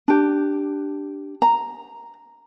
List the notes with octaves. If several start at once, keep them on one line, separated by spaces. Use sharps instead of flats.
D4 G4
A#5